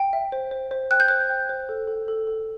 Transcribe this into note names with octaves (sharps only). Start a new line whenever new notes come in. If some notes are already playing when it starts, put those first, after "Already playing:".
Already playing: G5
E5
C5
C5
C5
G5 F#6
G6
C5 F#6
G5
C5
A4
A4
A4
A4